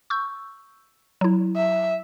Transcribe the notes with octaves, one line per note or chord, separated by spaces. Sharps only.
C#6 E6 G6
F#3 E4
E5